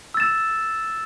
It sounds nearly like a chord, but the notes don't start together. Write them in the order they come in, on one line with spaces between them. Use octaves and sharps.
E6 A6 E7